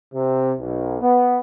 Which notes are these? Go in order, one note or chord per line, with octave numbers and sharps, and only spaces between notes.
C3
B1
B3